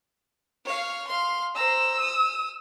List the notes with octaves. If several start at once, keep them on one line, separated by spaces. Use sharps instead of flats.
C#5 F5
F5 C6
C5 A#5 E6
D#6